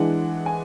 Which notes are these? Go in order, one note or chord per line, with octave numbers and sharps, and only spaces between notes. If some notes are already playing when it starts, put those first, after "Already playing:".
Already playing: E3 G#3 D4 F#5
G#5